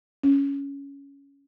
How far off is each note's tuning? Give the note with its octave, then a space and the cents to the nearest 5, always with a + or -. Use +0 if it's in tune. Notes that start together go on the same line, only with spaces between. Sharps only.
C#4 +10